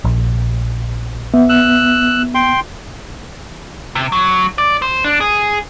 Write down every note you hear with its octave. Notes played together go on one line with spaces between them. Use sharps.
A#1
B3 E5
E6 F#6
G5 C6
C3
F#3
D5
C5
D4
G#4